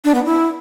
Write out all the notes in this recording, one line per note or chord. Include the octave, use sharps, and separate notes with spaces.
D4
B3
E4